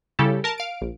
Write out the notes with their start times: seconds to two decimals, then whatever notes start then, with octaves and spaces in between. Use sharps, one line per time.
0.19 C#3 G3 E4 G4 A4
0.44 A#4 A5
0.58 F5 D7
0.81 A#1